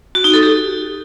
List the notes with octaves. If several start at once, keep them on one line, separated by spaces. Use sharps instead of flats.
F#4
D#4
A4
G4